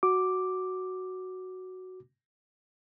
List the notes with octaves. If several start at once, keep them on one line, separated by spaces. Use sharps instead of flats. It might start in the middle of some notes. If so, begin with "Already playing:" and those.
F#4 D6